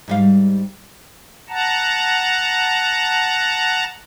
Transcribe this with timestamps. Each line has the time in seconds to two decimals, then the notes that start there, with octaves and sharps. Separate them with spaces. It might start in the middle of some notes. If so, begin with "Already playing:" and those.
0.08 G#2 G3 F5
1.49 F#5 A5 A#5